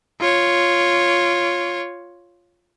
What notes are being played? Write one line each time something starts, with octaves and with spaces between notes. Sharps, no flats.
F4 C#5